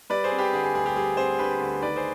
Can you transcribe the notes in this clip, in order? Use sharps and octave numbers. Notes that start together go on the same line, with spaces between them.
G3 B4 D5
G#4 C5
C4
G4 B4
D3 G#4
G#4
D2 G#4
G4
G3 G#4
C4 G#4 C5
D3 G4 B4
D2
D#3 B4 D5
G#4 C5